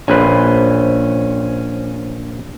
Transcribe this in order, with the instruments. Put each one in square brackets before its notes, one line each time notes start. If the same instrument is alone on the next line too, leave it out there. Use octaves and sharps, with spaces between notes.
[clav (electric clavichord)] A#1 B4 [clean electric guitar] C#4 C5